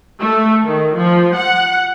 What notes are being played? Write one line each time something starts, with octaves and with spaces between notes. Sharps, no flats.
A3
D#3
F3
F#5